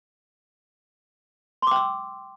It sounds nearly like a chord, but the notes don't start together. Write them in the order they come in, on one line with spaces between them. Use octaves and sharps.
C6 D6 G5 E6